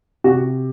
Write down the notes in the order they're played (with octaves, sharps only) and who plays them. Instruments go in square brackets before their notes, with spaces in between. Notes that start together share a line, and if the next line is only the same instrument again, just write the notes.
[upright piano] C3 F#4